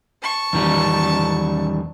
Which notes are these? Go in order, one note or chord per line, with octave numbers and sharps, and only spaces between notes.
A5 C#6
E2 D#3 G3